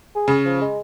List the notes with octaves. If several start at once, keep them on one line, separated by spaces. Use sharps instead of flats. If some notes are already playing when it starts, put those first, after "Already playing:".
G#4
C#3
F3
G#3